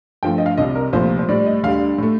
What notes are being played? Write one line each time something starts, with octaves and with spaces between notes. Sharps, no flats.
G2 F3 A3 G5
D#5
F5
C2 C3 G3 D#5
A#4
C2 A#2 F3 A3 C5
C5
A2 G3 D5
D#5
D2 D3 G3 F5
A2 A3